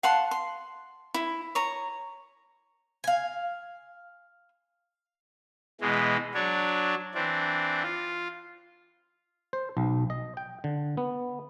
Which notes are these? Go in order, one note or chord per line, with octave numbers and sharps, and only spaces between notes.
F5 F#5 A5 C6
C6
E4
C#5 A#5
F5 G#5
B2 E3 G#3
F#3 D4 C#5
E3 C4 D4
F4
C5
B1
D#5
G5
D3
B3